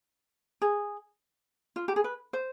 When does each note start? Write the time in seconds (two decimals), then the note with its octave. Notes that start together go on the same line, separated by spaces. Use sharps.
0.62 G#4
1.76 F4
1.88 G4
1.96 G#4
2.04 B4
2.33 C5